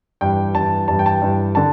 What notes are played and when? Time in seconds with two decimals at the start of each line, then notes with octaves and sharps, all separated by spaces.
0.21 G2 E3 G5
0.55 G2 E3 A5
0.88 G2 E3 A5
0.99 G5
1.06 A5
1.10 G5
1.22 G2 E3
1.55 D3 A5